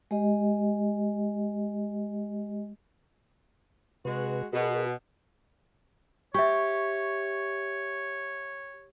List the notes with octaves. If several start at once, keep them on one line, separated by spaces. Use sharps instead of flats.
G#3 G4 D#5
C3 G#3 F#4 B4
B2 F#4 G#4 A#4
G4 C#5 E5 C#6